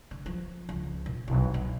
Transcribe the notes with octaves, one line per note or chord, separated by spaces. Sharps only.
D3
F3
C#2
A#1
B1
D#3